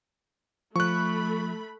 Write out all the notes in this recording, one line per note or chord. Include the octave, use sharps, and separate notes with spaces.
F3 A3 B5 C#6 F#6